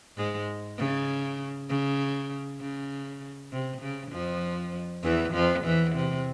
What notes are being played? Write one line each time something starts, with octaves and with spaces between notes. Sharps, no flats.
G#2 G#3
C#3
C#3
C#3
C3
C#3
F2 F3
E2 E3
F2 F3
E2 E3
C3